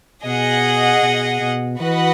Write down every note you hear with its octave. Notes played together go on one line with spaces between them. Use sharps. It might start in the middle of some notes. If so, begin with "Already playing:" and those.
B2 G#4 D#5 F#5
B2
B2
E3 F#4 B4 D#5 F#5